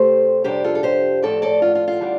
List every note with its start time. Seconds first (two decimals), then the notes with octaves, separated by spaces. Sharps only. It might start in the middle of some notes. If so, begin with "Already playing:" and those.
Already playing: C3 A3 C4 G4 C5
0.44 F2 C3 G3 D4 G4 C5
0.64 F4 A4
0.75 A4
0.83 G4 C5
1.22 A2 F3 A3 C4 A4 D5
1.42 A4 D5
1.62 F4
1.75 F4
1.88 F4
2.01 D3 G3 D4